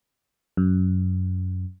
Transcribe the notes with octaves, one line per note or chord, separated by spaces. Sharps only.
F#2